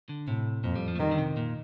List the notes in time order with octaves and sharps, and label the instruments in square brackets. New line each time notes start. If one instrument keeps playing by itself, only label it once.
[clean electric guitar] D3
[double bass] A2 [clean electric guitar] C3
[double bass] F2 [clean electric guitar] A#2
[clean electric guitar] G3
F3
A3
[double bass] D#3 [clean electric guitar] G3
[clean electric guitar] D3
C3
A#2